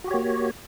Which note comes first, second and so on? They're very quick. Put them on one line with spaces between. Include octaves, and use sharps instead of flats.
F#4 G4 C#5 A#3